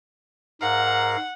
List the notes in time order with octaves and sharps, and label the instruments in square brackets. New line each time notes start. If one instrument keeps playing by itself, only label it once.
[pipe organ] G#2 A#4 F5 [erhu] F#5